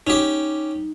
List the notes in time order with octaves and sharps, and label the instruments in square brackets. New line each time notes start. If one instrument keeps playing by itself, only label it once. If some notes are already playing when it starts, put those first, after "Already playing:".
[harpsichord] C#4 G4 [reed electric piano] D#4